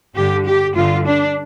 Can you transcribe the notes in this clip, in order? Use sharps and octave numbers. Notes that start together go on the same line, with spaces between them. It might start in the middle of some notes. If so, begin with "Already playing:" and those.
G2 D3 G4
G4
G2 D3 F4
D4